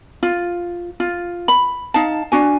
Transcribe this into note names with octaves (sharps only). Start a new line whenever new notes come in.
F4
F4
B5
D#4 F5 A5
D4 F#4 G#5